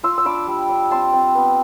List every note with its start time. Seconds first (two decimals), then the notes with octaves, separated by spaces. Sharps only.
0.03 F4 C6 E6
0.18 E6
0.25 D4 B5 D6
0.47 G3
0.69 D4
0.91 C4 A5 C6
1.13 C4
1.35 B3